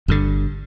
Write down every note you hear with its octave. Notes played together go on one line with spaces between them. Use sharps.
G1 G2 D3